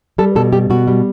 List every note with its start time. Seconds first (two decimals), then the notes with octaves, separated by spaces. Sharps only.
0.18 G3 A4
0.35 B2 A4
0.53 G3 G4
0.70 B2 F#4
0.87 G3